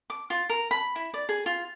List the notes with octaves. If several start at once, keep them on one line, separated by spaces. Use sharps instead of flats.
D6
F4
A#4
B5
E4
D5
G#4
F4